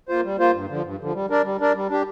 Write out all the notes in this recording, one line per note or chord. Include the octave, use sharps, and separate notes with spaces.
A#3 F4 C5
G3
A#3 F4 C5
G2
D3 F3
G2
D3 F3
G3
D4 A#4 D5
G3
D4 A#4 D5
G3
D4 G4